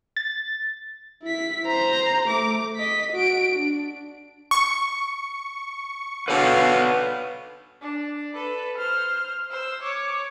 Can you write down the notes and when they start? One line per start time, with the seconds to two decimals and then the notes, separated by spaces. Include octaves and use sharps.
0.17 A6
1.23 E4 B6
1.66 C5 A#5
2.29 A3 D6
2.77 D#5 B6
3.13 F#4 D7
3.56 D4
4.51 C#6
6.28 B2 D3 B4 C#5 F5 F#5
7.81 D4
8.33 A4 B4
8.78 C5 F6
9.51 C5 E6
9.82 C#5 D6